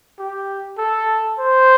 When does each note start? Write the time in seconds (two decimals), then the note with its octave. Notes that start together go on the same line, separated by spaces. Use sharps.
0.19 G4
0.78 A4
1.39 C5